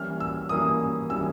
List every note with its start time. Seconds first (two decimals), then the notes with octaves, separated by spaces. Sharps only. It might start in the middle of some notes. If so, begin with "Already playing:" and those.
Already playing: E3 G3 A#3 C#4 F6
0.20 E6
0.49 E3 G3 A#3 C#4 D#6
1.09 E3 G3 A#3 C#4 E6